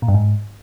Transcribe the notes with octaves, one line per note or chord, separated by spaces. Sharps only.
A#2
G2
G#2